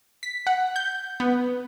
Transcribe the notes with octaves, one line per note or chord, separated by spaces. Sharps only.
B6
F#5
G6
B3